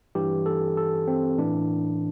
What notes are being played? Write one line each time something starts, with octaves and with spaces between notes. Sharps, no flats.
G2 E3 G4
A4
A4
C4
A2 E3 D4